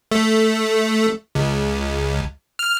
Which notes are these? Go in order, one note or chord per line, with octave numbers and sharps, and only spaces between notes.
A3
C#2
F6